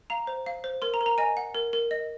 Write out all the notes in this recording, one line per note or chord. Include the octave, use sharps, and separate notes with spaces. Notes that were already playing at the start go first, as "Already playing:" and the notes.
F5 A#5
C5
F5
C5
A#4 C6
A#5
A#4
A#5
D#5 G#5
F#5
A#4
A#4
D#5